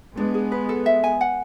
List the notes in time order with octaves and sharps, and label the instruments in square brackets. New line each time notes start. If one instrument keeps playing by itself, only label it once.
[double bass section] G#3 B3 [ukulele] D4
[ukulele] G#4
B4
A4
E5
G#5
F#5